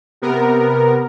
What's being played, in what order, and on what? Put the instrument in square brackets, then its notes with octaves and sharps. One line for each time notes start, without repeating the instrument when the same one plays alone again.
[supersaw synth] C3 B3 A#4